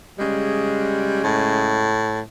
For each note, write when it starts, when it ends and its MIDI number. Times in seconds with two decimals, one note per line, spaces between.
0.19 2.00 49
0.19 1.23 55
0.19 2.00 56
1.24 2.20 45